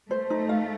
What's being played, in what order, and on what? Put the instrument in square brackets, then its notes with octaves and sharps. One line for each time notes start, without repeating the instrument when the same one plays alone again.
[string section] A3 [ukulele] C5
[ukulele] D#4
F5